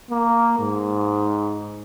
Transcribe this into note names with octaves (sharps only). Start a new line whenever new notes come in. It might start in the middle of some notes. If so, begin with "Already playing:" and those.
A#3
G#2